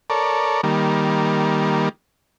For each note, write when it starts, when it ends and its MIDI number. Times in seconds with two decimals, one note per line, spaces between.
0.10 0.61 69
0.10 0.61 70
0.10 0.61 73
0.10 0.61 74
0.64 1.89 51
0.64 1.89 55
0.64 1.89 58